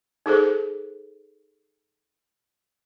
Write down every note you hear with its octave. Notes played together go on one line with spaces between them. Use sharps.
D#4 G#4 A4 C5